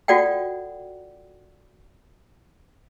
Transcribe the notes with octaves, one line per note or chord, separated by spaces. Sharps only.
F4 F#4 A4 D5 F#5 G5